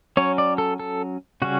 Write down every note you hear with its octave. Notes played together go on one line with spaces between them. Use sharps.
F#3 C#4 C#5
D5
A4
A4
C#3 G3 C#4 F#4